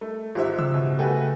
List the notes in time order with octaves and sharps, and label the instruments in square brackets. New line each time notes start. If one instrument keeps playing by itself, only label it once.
[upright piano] A3
[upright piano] G#1 G#2 E5 [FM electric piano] F4 G4 C5
[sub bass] C#3 [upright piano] E6
[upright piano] B2
[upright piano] A3 F#4 B4 [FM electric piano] G4 G5 G#5